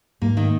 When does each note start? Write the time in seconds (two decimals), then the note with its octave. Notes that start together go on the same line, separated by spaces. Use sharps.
0.22 G#2 A#3
0.37 D#3